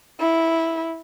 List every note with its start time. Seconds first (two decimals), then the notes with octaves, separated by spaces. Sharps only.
0.20 E4